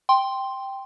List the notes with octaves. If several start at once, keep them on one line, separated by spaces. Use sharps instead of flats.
G5 C6